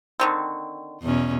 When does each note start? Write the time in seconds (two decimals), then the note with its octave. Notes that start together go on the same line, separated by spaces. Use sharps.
0.20 D3 D#3 C4
1.02 E2 B2 C#4